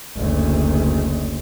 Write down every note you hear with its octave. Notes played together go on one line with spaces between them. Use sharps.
F#1 D2